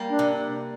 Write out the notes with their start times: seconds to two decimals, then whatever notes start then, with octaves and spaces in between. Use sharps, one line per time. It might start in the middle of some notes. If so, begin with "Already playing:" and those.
Already playing: G3 A#3
0.10 D4
0.19 C3